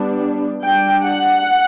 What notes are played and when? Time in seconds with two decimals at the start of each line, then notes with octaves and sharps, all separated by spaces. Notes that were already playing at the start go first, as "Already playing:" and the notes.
Already playing: G3 B3 D4
0.62 G3 D4 G5
1.03 F#5